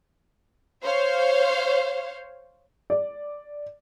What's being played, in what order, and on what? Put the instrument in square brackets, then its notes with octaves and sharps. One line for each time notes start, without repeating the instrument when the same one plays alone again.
[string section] C5 C#5 F5
[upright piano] D5